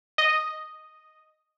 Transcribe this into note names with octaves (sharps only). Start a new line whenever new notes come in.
D#5